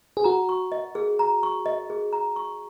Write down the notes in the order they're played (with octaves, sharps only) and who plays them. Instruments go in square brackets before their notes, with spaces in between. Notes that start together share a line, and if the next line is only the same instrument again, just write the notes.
[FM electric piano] G#4
[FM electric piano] F#4 [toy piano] A#5
[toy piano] C#6
D#5
G#4
A#5
C#6
D#5
G#4
A#5
C#6